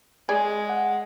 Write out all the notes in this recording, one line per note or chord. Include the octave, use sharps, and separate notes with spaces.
G#3 G#4 D5
F#5